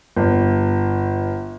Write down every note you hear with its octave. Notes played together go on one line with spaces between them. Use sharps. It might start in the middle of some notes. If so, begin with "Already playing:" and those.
G1